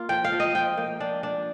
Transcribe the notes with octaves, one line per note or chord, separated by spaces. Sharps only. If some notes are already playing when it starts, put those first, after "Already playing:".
Already playing: A#3 F4
F3 G5
F5
F3
D#5
F3 G5
A#3
D4
D4